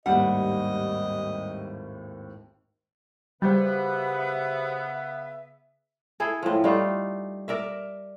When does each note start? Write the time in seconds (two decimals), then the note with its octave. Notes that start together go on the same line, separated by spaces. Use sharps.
0.06 G#1 D#2 A2 G3 D#5 F#5
3.42 C#3 G3 B3 F#4 G4 C5 E5
6.20 E4 G#4 A4
6.43 A2 F3
6.64 G3 A3 D#4 F4
7.48 A#4 D5 E5